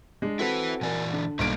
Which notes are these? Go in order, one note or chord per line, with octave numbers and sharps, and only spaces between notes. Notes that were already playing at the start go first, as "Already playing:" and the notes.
G#3 D4
C4 E4 F#4 A4 B4
A#2 E3 A#4 D5 G#5
D3
B1 G3 A#3 D7